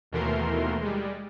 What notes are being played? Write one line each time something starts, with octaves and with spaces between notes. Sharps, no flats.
D#2 B2 E3 A3 A#4 C6
G3 G#3